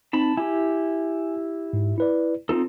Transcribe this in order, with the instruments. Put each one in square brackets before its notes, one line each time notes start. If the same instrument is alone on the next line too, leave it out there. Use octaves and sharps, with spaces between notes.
[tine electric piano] C4 D#4 [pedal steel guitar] A5 B5
[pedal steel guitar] E4 G4 [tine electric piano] G#5
[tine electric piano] G#2
E4 B4 D5
[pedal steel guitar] C4 D#4 A4 [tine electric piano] F4